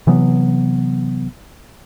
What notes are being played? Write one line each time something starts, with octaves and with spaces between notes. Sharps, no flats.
C3 E3 F#3 B3